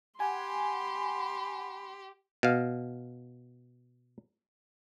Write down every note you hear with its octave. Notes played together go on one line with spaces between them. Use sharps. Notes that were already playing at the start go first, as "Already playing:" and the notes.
G4 F#5 G#5 B5 C6
B2 F5